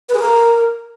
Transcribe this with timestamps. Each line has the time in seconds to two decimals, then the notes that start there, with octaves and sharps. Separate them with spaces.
0.09 B4
0.14 G#4
0.20 A#4